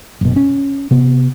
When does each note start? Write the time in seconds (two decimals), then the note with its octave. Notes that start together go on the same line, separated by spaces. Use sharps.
0.21 F#1 B2
0.36 C#4
0.91 C3 B3